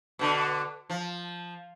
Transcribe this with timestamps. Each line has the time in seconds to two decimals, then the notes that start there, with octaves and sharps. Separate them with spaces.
0.19 B2 D3
0.90 F3